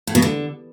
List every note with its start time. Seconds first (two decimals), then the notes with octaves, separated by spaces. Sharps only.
0.07 A2
0.15 B2
0.22 D3